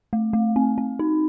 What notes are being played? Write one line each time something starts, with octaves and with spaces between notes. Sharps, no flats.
A3
A3
C4
C4
D#4